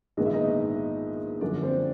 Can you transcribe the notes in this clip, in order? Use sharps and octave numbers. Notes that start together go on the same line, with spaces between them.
A#1 G#2 D#3 G#3 B3 D#5
E5
D#4 D#5
F#2 D3 F3 D4 D5
C4 C5